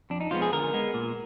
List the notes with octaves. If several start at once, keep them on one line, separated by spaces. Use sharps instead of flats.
F2 D4
D#4
F3 G#3 B3 F4
G#4
D3 A#4
G#3 B3
A#2